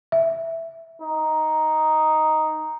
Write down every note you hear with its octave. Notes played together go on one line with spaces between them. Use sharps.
E5
D#4